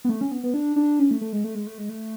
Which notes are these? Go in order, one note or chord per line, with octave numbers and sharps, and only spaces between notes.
B3
A3
C#4
B3
B3
D4
D4
C#4
A3
A3
G#3
A3
G#3
A3
G#3
A3